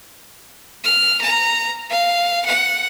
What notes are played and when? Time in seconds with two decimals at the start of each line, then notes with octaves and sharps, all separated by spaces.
0.84 F6
1.21 A#5
1.90 F5
2.46 F#5